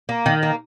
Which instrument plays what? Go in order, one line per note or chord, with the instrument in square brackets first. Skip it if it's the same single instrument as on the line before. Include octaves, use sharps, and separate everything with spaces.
[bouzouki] A#3
D#3
A#3